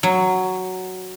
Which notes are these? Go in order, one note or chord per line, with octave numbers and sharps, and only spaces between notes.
F#3